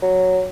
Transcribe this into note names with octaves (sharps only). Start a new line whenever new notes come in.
F#3